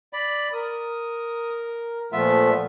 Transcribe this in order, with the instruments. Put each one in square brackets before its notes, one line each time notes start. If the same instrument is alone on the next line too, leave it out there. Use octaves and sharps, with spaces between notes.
[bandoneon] D5 B5
[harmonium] A#4 [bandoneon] D#6
[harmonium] A#2 F3 A3 [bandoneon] B3 F4 E5